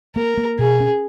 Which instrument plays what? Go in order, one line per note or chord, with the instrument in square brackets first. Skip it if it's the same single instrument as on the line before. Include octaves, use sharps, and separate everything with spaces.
[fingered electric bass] A#3 [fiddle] A#4
[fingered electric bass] A#3
[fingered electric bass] B2 [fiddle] G#4
[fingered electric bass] C#4